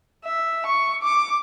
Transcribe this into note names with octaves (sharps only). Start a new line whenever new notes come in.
E5
C#6
D6